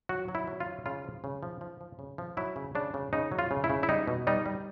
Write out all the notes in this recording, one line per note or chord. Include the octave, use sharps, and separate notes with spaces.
F#3 F#4
F#3
E4
F#3
F4
F#3
C#3 F4
F3
C#3
F3
F3
F3
C#3
F3
F#3 E4
C#3
C#3 D4
C#3
C#3 D#4
F#3
F4
C#3
E4
C#3
E4
G3 D#4
B2
G3 D#4
G3